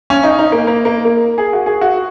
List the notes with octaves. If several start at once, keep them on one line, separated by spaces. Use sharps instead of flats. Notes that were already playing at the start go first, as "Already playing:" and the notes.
C#4
D#4
D#4
A#3
A#3
A#3
A#3
G#4
F#4
G#4
F#4